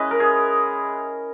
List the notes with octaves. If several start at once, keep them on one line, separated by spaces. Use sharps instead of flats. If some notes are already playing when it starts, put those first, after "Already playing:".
Already playing: G#3 C#4 E4 B4 D#5
A#4
G#4